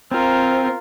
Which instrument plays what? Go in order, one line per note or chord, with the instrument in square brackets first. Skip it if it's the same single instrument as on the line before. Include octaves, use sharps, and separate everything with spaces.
[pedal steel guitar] C4 [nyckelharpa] F4 A#4